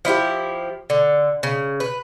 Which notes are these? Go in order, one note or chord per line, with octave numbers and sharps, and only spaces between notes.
F3 E4 F4 G4
D3
C#3
B4